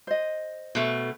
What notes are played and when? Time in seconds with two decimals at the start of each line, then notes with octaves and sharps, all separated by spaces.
0.07 C5 D#5
0.75 B2 A3